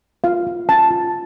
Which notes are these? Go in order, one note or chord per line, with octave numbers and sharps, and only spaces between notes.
F4 F5
F4
C#4 A5
F4